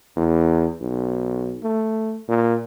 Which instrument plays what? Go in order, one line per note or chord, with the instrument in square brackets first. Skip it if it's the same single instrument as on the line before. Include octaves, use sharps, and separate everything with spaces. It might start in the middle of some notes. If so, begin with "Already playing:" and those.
[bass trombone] E2
B1
A3
A#2